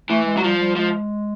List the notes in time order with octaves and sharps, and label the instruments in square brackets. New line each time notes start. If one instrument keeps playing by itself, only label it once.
[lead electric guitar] E3 [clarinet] A3
[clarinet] G#3
[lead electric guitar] F#3
[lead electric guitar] F3 [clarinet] G3
[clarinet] G3
[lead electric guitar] F3 [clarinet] G#3